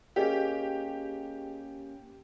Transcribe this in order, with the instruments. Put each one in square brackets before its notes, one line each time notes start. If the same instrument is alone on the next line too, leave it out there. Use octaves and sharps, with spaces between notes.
[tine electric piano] A#3 C#4 [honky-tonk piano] G4 [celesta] G#4 D#5